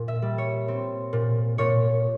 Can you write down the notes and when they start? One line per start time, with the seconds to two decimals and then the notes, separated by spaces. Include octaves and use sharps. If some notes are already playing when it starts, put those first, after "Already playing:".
Already playing: A#2
0.08 E5
0.22 G3
0.38 C#5
0.68 C4
1.13 A#2
1.58 A#2 C#5